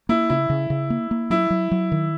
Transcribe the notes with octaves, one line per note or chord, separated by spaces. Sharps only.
A#3 E4
C#3 E4
C#3
C#3
A#3
A#3
F#3 E4
F#3
F#3
D#3